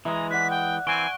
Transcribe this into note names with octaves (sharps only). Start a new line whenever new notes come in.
E3 G#3 E5 A#5
D5 F#5 F#6 B6
G5
E3 C4 G#5 C#6 D7 G7